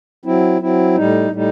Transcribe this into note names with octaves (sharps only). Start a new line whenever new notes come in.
F#3 C4 E4
F#3 C4 E4
A2 G3 D#4
A2 G3 D#4